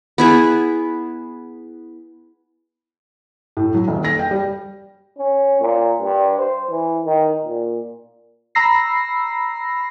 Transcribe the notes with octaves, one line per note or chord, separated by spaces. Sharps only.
B3 E4 G#4
A2
F#3
D#1
A#6
G5
G3
C#4
A#2
G2
C5
E3
D#3
A#2
A#5 B5 E6 A#6 C7